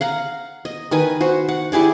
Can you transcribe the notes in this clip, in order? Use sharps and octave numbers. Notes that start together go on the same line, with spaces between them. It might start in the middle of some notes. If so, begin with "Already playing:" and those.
F5 F#5 A#5
D#5
D#3 B4 G#5
F#4 C5
F#5
E4 G4 G#4 D5